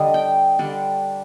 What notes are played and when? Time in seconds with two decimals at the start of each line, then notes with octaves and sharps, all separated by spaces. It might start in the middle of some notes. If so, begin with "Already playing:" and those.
Already playing: D3 G3 D4 D#5
0.14 G5
0.59 D3 G3 D4